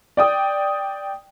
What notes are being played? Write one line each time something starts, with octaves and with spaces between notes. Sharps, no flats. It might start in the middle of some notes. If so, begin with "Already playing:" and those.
D5 G5 D#6